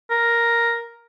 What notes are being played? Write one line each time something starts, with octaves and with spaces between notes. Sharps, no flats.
A#4